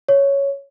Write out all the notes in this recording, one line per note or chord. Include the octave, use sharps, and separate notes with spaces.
C#5